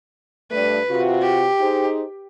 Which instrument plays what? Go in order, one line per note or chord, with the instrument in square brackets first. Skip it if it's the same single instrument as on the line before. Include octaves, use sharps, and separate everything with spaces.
[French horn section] G2 A3 D5 [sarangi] B4
[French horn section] C3 F4 F#4
[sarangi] G4
[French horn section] D#4 G#4 C5